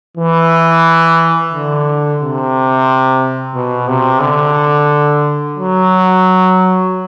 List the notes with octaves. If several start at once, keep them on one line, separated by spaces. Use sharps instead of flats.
E3
D3
C3
B2
C3
D3
F#3